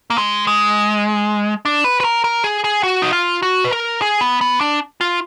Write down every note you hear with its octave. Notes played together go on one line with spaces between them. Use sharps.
A#3
G#3
G#3
D4
B4
B4
A#4
A#4
G#4
G#4
F#4
D#4
F4
F#4
B4
A#4
G#4
B3
B3
D4
F4